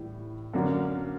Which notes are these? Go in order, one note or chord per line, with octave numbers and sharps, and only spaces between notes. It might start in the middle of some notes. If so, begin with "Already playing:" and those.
Already playing: A2 E3 G3
F#2 D3 F#3 A#3 D4